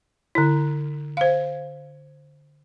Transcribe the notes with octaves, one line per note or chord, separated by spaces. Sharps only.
D3 E4
C5 F5